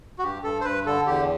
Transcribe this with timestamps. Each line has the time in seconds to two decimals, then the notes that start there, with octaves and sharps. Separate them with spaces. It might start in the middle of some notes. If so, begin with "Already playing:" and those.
0.19 F#4
0.23 G2 G4
0.44 G2 A4
0.61 C5
0.65 G2 B4
0.86 D3 A4
1.07 E2 G4